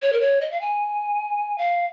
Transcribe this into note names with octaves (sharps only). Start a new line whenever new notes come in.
C#5
A#4
C#5
D#5
F5
G#5
F5